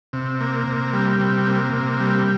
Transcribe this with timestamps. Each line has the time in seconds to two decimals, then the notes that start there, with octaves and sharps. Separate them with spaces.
0.13 C3
0.41 A#3
0.68 C3
0.93 G3
1.20 C3
1.47 A#3
1.73 C3
2.00 G3